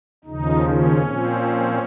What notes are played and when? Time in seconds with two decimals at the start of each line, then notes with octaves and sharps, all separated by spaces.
0.25 D#2 C#3 F3 D#4
0.64 C#4
1.02 A#2 F3 C4